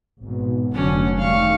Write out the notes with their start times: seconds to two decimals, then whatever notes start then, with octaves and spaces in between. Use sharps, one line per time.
0.22 G#1 G#2 B2
0.73 F1 D3 F#3 C#4 D4
1.18 D#3 G3 F5 C#6